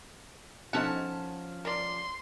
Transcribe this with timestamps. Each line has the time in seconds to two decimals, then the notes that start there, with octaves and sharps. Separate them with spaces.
0.73 F3 C#4 D#4 A4 F#5 A5
1.65 A#4 D5 C6